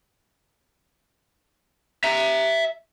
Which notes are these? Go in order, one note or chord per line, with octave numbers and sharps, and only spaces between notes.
E5 A#5